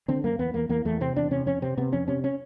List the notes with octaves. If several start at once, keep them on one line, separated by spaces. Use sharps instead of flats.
D3 C4
F#2 A#3
E2 B3
E2 A#3
E2 A#3
E2 A3
C3 C4
E2 D4
C3 C#4
F2 C#4
C3 C4
C3 B3
F2 C#4
C3 C#4
C#4